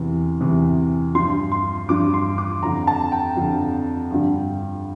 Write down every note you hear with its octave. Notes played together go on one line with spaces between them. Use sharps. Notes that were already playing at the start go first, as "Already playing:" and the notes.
Already playing: E2 C3 E3
E2 C3 E3
G2 F3 C6
C6
G2 F3 D6
C6
D6
F2 D3 F3 A#5
A5
G5
F2 D3 F3
G2 D3 F3